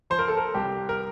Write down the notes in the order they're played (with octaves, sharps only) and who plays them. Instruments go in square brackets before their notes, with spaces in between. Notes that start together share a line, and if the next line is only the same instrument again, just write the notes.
[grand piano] F3 C5
A#4
A4
A#4
C2 G4
A#4